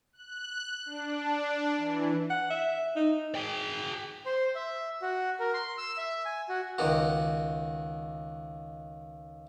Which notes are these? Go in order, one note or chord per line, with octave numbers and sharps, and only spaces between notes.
F#6
D4
E3
F#5
E5
D#4
G#4 G5
C5
E5
F#4
A#4
C6
E6
E5
G#5
F#4
C#2 D#3 F#4